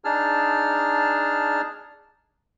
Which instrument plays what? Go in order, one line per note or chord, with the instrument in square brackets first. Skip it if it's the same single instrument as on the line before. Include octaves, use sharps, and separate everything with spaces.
[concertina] D4 D#4 G#4 A5 F6